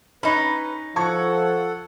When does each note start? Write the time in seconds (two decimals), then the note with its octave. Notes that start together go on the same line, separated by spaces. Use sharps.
0.23 C#4 D#4 B4 B5
0.96 F3 A4 F#5 A5 C#6 G#6